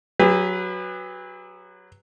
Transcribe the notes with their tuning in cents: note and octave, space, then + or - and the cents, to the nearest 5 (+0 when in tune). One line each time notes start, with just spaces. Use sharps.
F#3 +0 G#4 -45 B4 +0